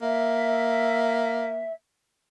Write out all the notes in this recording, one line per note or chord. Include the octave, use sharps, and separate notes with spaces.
A#3 E5